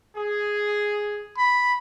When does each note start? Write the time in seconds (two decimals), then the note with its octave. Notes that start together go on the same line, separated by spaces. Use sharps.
0.16 G#4
1.37 B5